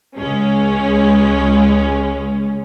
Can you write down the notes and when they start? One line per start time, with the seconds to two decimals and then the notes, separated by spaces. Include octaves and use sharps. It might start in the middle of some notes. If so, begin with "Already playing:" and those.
0.16 C#2 G#3 C#4